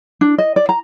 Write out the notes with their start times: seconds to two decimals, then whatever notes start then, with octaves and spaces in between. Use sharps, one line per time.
0.21 D4
0.38 D#5
0.56 D5
0.69 A#5